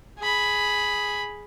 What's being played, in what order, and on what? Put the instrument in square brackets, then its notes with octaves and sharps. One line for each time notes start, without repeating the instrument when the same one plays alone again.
[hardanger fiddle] G#4 B5